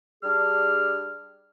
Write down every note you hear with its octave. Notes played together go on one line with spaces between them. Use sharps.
G3 D4 G#4 F6